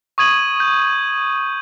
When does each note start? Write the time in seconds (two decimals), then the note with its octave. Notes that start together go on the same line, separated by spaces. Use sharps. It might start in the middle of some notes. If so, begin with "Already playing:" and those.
0.18 C#6 D#6 G#6 D#7 F#7
0.60 G6